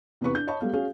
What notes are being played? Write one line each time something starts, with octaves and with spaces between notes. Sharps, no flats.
E2 C3 B3 B4 C#6
D4 G6
C#5 D#5 A5 B5 C#6
G3 A3 B3 F5
C#4 F#4 G#4 F5